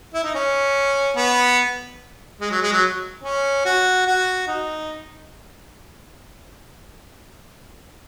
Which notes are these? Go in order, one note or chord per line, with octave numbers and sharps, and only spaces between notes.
E4
D#4
C#4
B3
G#3
F#3
G#3
F#3
C#4
F#4
F#4
D#4